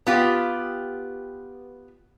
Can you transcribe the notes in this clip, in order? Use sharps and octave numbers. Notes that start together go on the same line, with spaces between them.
B3 F4 G4